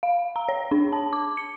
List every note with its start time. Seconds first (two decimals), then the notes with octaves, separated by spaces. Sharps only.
0.03 F5
0.36 A#5
0.49 C#5
0.71 D4
0.93 A5
1.13 D6
1.37 C#7